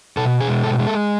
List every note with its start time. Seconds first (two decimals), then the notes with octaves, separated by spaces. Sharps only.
0.17 B2 A4
0.40 G#4
0.48 G#3
0.64 A4
0.79 G#3
0.87 A4